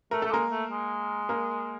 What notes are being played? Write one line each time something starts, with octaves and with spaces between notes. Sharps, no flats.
A3 A#4
A3 A4
G#3 A#3 A#4
A3
G#3
A#3 A#4